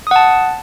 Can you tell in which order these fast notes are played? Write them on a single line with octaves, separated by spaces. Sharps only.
D#6 F#5 A5